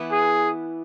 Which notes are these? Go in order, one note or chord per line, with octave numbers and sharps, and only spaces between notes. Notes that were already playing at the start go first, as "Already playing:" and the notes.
Already playing: E3 B3 E4 B4
G#4